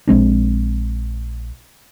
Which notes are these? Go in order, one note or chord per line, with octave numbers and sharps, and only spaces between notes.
A#1 G#3 C4 D4